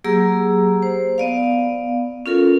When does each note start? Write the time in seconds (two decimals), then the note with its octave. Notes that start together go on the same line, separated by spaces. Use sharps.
0.04 F#3 A#3 G4 G#4 A#5 E6
0.83 C5
1.18 B3 D5 F5
2.26 C#4 F4 A4 A#4